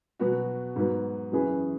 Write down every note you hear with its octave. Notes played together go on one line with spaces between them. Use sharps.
B2 F#3 B3 F#4
G#2 F#3 B3
F#2 E3 C#4 G#4 B4